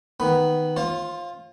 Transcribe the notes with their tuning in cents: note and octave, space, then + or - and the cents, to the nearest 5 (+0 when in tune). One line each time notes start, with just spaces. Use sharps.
D#3 +0 B3 +0 B5 +0
F4 +0 C5 +40